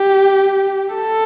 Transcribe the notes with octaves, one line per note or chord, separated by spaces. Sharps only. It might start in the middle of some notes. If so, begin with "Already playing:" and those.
Already playing: G4
A4